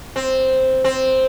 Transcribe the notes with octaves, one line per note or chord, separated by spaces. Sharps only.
C4
C4